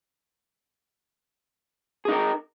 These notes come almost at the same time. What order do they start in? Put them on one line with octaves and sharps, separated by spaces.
G#4 D#4 A#4